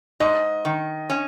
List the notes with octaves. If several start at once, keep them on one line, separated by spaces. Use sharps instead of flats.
G#2 D#5
D#3
C#4